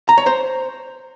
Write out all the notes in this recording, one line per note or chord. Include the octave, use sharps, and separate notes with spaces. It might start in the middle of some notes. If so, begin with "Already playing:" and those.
A#5
C#5
C5